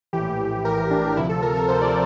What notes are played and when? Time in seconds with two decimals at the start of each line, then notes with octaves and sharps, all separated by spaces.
0.13 A#1 A2 E3 G4
0.65 A#1 A2 E3 A#4
0.91 D4
1.16 D2 C3 F3 E4
1.29 A4
1.42 A#4
1.55 A4
1.68 D2 C3 F3 C5
1.82 D5